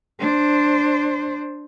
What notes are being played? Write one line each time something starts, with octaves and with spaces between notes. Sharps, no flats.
D4 C5